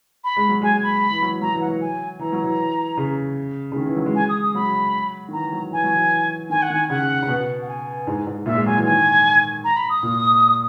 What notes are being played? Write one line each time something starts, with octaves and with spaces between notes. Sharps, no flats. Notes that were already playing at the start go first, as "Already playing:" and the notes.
B5
G#3
F#3
G#3 G#5
B5
E3
F#3
F#3 A#5
E3
F#5
F#3
G#5
E3 A#5
F#3
E3
C#3
C#3
D#3
E3
F#3
G#3
G#5
D#6
D#6
F#3 B5
D#3
E3 A#5
F#3
E3 G#5
F#3
E3
D#3 G#5
F#5
D#3 G#5
C#3 F#5
C#3
B2
F#5
G#5
G#2
G#2
A#2 E5
G#3
F#3 G#5
E3
D#3 G#5
A#5
B5
D#6
A#2